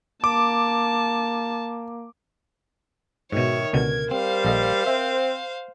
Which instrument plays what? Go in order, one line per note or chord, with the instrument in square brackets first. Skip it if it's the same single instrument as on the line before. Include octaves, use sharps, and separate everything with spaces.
[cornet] A#3 [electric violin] A5 [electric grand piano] D6
[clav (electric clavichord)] G#2 B2 [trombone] D#3 [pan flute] F#4 [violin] C#5 E5
[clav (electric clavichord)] C#2 B2 D3 [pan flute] A#4 [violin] G#6
[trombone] G3 [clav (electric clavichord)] C4 [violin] C5 F5
[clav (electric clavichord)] A#1 A4 D#5
[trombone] C4 [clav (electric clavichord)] E5